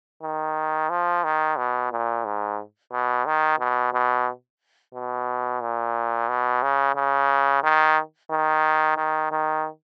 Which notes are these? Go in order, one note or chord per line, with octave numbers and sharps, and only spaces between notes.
D#3
F3
D#3
B2
A#2
G#2
B2
D#3
B2
B2
B2
A#2
B2
C#3
C#3
D#3
D#3
D#3
D#3